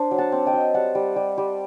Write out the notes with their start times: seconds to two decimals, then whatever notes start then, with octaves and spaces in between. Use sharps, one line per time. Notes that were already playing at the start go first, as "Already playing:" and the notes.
Already playing: D4 C5
0.11 F#3
0.18 F#5 A5
0.32 C4
0.46 D#5 G5
0.53 F#3
0.74 G3 F#5 A5
0.95 G3
1.16 G3
1.38 G3